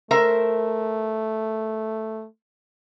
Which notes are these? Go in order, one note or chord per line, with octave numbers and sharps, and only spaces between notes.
A3 A#4 C5 E5